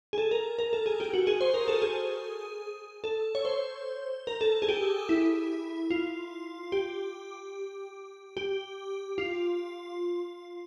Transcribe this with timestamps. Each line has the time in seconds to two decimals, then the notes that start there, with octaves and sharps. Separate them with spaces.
0.13 G#4
0.18 A4
0.31 A#4
0.59 A#4
0.73 A4
0.86 G#4
1.00 G4
1.13 F#4
1.27 G#4
1.41 C5
1.54 A#4
1.68 A4
1.82 G#4
3.04 A4
3.35 C#5
3.45 C5
4.27 A#4
4.41 A4
4.62 G#4
4.69 G4
5.09 E4
5.90 F4
6.72 G4
8.37 G4
9.18 F4